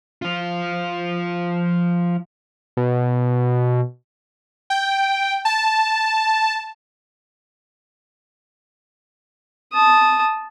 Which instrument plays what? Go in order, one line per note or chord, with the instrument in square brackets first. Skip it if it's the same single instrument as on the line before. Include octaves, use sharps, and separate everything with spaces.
[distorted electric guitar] F3 F4
[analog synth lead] B2
[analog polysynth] G5
A5
[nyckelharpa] A5 D#6